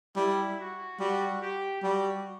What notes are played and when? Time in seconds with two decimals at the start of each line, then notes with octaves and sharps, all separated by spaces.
0.16 G3 E4
0.59 F#4
0.99 G3 F#4
1.41 G4
1.82 G3 F#4